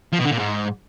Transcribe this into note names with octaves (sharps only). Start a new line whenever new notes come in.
F3
B2
D3
A#2
G#2